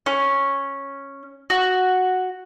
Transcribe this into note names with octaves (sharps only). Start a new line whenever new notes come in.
C#4
F#4